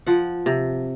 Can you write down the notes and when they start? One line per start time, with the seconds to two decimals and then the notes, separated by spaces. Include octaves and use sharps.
0.06 F3 F#5
0.46 C3